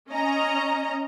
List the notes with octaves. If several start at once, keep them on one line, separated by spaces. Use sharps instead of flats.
C#4 D#5 A#5